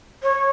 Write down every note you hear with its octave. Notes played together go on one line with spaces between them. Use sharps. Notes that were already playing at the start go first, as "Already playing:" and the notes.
C#5